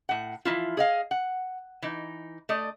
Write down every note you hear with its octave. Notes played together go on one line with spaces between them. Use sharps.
A2 F#5
E3 F3 A#3 E4 F4
G#4 D#5 F5
F#5
E3 D#4
A3 D5 D#5